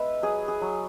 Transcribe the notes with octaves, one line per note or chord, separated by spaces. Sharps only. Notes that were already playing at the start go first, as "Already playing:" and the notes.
Already playing: G#3 B3 E4 B4 E5
F#3 G#4
G#4
F#3